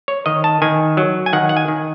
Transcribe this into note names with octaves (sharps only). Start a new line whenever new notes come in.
C#5
D#3 D#5
A5
D#3 G#5
F#3
G#5
D#3 F#5
F#5
G#5
D#3